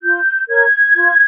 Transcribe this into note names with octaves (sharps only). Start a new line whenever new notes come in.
F4 G6
A#4 C#5 G#6
F4